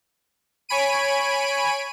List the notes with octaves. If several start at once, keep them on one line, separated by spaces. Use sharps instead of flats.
C#5 G#5 B5 D7 D#7